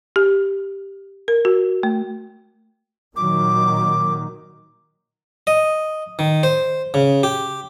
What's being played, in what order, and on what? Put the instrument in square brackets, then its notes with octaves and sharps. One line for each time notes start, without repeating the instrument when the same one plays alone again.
[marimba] G4
A#4
F#4
A3
[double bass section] A#2 D#3 F#3 [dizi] D6
[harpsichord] D#5
D#3
C5
C#3
G4